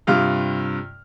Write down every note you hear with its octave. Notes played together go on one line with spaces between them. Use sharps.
G2 C3 F4 F6